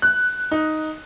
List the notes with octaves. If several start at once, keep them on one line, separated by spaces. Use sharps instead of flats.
F#6
D#4